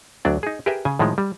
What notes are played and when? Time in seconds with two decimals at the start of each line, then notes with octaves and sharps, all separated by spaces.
0.25 D2 F#3 D4 D5
0.43 D#4 G#4
0.66 G4 G#4 A#4 B4 E5 G5
0.85 C#3 G#5
0.99 A2 D#3 F3 G#3
1.18 G3